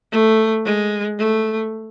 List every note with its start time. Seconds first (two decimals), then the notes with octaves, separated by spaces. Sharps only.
0.12 A3
0.65 G#3
1.19 A3